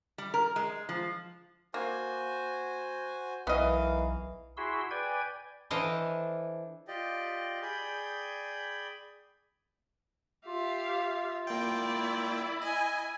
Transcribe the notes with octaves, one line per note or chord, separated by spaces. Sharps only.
G3
A#4
G#3
F3
A#3 F#4 C5 G#5
B1 E3 B3 A#4 D#5 F5
E4 F#4 G#4 C6 E6
B4 D5 G5 G#5 G#6
E3 D4 A4 C5 D#5 F5
F4 G4 D5 D#5 G5
G#4 D5 G5 G#5 B5 G6
F4 G4 E5 F5
A#3 E4 D5 G5 B5
D#5 G#5